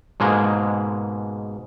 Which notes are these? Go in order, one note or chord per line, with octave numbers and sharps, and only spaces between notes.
G#2 B2 G#3 A#3